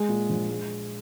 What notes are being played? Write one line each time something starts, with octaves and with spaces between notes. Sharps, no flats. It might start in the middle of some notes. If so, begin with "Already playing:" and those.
Already playing: G#3
A#2
A#1
G#3